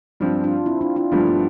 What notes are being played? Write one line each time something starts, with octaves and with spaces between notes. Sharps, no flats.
G2 F3 C4 D4 F4
D4 F4
C4 E4
D4 F4
D4 F4
G2 F3 A3 B3 D4
G3 B3